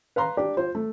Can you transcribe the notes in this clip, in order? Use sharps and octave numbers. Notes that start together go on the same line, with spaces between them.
B4 F5 A#5 C6
D4 G4
F4 C5
A3